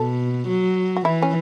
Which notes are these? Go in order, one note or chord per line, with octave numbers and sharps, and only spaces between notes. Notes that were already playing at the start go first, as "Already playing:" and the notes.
Already playing: B2 A4
F#3
F#4
E3 E4
C#4